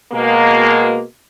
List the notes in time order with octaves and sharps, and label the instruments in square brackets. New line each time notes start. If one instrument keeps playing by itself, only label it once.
[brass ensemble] B2 G#3 A#3